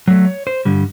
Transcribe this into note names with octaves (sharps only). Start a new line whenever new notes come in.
F#3 A3
C#5
C5
G2 D3 G3